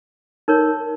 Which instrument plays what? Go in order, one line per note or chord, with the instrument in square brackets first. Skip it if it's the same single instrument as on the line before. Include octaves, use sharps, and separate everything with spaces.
[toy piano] D#4 A#4 C#5